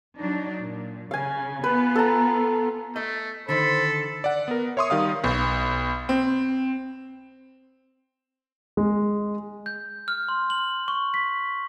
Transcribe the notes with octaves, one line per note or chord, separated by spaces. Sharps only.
F#3 D4 D#4
A#2
C#3 F5 G#5
B3 F4 B4
A4 A#5
A3 D#5
D3 D#3 A4 C5 B5
D5 F#5
B3 A#4
C#5 E5 C6 C#6 D#6
D#3 G3 F5 D#6
B1
C4
G#3
G6
F6
C6
F#7
C#6
B6